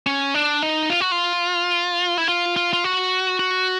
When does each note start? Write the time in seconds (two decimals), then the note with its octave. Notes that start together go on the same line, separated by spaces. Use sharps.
0.07 C#4
0.34 D4
0.63 D#4
0.90 F4
1.01 F#4
1.12 F4
2.18 E4
2.28 F4
2.56 F4
2.73 F4
2.84 F#4
3.39 F#4